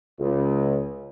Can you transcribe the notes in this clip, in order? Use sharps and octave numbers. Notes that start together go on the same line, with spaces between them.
C#2